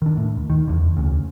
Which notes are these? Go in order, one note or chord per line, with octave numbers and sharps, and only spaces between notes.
D#3 D4
A2
D#2
D#3
E2 D3
D2 C#3